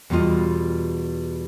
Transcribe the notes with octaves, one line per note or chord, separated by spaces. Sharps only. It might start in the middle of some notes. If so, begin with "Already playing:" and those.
E2 B2 G3 A3 F4 D#5